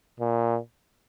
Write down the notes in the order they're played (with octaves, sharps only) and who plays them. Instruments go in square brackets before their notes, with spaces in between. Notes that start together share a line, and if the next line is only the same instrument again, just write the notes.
[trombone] A#2